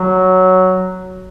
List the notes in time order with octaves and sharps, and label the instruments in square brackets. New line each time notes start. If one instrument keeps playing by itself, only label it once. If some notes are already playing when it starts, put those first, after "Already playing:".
Already playing: [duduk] F#3